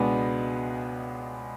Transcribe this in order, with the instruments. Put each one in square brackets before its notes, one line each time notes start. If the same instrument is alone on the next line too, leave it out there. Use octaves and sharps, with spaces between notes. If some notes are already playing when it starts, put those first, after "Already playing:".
Already playing: [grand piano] C#2 B2 G#3 B3 D4